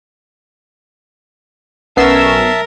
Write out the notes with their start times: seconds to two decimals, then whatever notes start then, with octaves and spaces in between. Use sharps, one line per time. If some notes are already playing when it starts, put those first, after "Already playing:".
1.97 B1 B3 C#4 A#4 E5 A5 E6 C7